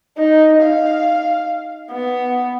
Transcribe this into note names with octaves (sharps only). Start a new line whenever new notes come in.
D#4
F5
B3